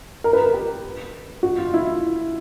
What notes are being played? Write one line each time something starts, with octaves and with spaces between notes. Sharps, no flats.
A#4
B4
A#4
G4
F#4
F4
E4